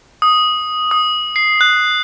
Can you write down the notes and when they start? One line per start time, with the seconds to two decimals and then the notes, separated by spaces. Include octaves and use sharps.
0.22 D#6
0.91 D#6
1.36 C7
1.61 F#6